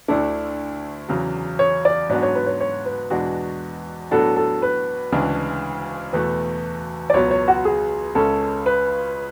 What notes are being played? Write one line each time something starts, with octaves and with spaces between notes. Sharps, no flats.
D2 D3 A3 D4 E4
E2 C#3 F#3
C#5
D5
G#2 F#3 B3 D4 F#4 D5
C#5
B4
C#5
C#5
B4
E2 B2 G#3 D4 F#4
A2 F#3 B3 D4 F#4 A4
A4
B4
D2 C#3 E3 G#3 D4
E2 B2 A3 B4
D5
C#2 B2 F#3 B3 C#5
C#5
F#4
G#4
C#2 C#3 G#3 C#4 A4
B4